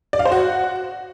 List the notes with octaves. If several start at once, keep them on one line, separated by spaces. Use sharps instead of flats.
D5
F5
C5
F#4